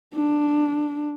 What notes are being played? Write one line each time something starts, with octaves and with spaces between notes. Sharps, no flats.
D4